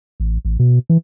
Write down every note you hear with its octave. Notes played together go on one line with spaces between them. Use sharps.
A1
A1
B2
E3